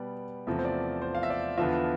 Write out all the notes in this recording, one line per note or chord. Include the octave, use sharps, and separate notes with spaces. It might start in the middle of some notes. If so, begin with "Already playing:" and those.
Already playing: B2 G3 B3 D5
E2 C3 F3 A3 E5
C5
D5
C5
F5
E5
D5
E2 D3 F3 B3 F4 E5